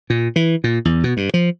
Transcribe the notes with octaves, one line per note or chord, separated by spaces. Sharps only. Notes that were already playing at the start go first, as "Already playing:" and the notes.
A#2
E3
A#2
E2
B2
G2
F3